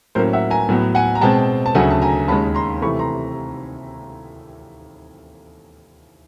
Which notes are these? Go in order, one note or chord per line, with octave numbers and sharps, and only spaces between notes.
A2 F#3 A#3 C#4 A#4 C5
E5 F#5
G#5 A#5
A2 F#3 B3
F#5 G#5
A#5
B2 G#3 C4 G5 A5
A5
D2 C#3 F#3 A3 F#5 G#5
A5
G#5 A#5
D#2 D#3 G#3 C#4 A5 B5
A#5 C6
C3 E3 A3 B5 C#6
A#5 C6